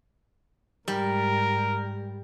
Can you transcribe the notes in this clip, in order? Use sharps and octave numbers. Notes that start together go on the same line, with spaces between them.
G#2 G3 A#4